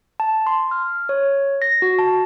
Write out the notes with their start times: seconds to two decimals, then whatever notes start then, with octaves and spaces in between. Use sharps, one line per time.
0.20 A5
0.47 C6
0.71 F6
1.09 C#5
1.62 A#6
1.82 F#4
1.99 A5